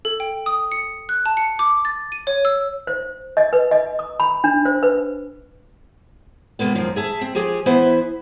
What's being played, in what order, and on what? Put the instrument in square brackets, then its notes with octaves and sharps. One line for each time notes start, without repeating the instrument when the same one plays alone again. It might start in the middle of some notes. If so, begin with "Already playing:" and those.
[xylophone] A4
G5
D#6
C#7
F#6
A5
C#7
D6
A6
D#7
C#5
E6
[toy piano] C5
D#5
B4
D#5
D#6
B5
D4
C5
B4
[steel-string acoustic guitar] C3 G#3 A#3 B3
F#2 D#3 F3 C4
G#4 E5 A5
C4
F3 G4 G#4 G#5
E3 B3 E4 B4 C5 E5